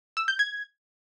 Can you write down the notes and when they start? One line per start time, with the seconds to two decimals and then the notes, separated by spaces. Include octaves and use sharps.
0.17 E6
0.28 G6
0.39 G#6